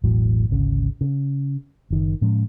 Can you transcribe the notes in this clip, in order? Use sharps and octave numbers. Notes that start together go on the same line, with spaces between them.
E1 A1 A2 F#3
G#1 D2 C#3
C#3
F#1 D#3
A2 F3 G#3 C#4